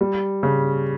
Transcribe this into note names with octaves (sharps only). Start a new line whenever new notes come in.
G3
C#3